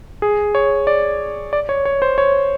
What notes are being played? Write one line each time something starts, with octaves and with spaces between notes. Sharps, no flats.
G#4
C#5
D5
D5
C#5
C#5
C5
C#5